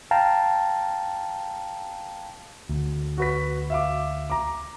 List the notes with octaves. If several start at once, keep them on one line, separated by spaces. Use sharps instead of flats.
F5 G5 A5 A#5
D2
F#4 B4 B6
E5 F5 D6
A#5 D6